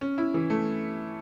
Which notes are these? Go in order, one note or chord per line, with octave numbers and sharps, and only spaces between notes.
C#4
E4
E3
A3